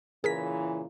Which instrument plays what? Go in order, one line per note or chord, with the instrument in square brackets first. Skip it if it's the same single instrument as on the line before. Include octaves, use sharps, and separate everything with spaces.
[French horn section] A#2 C#3 E3 [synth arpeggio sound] G#4 A#4 B6